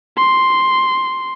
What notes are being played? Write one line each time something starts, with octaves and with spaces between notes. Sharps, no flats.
C6